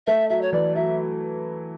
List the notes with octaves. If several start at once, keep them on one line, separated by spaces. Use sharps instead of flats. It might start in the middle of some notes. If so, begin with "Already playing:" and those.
A3 E5
F#3 E5
C#5
E3 D5
F#3 E5